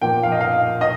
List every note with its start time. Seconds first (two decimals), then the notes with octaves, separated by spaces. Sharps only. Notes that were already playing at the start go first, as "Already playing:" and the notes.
0.02 A#2 F3 A#3 G5
0.23 F5
0.32 D#5
0.41 F5
0.81 D#5